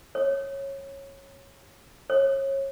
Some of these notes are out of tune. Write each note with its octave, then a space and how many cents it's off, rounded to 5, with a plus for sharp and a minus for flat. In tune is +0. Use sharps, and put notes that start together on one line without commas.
C#5 -15
C#5 -30